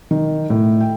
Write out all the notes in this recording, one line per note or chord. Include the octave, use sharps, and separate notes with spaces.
D#3
A2
G5